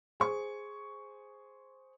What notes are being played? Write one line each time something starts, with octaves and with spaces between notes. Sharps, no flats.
G#4 C5 C#6